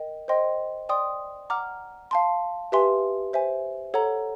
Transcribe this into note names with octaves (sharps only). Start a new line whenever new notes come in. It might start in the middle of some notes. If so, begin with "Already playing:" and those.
Already playing: A#4 D#5 G5
C5 D#5 G5 C6
D5 G5 C6 D#6
F#5 A#5 D6 F6
F5 A5 C6
G4 B4 E5 G#5 C6
C5 E5 G#5
A4 C#5 F#5 A#5